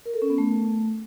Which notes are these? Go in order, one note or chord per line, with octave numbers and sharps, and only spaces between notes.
A#4
A4
C#4
B3
A3